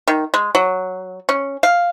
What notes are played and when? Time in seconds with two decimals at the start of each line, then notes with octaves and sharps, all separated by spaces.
0.08 D#3
0.34 G#3
0.55 F#3
1.29 C#4
1.63 F5